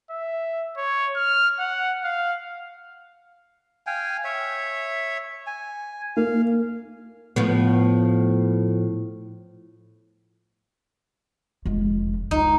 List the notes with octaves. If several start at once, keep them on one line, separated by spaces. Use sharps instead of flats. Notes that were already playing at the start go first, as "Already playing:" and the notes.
E5
C#5
F6
F#5
F5
F5 G5 G#5
C#5 E5
G#5
A#3 F5
A2 F3 B3
F1 G#3
C#2 D#4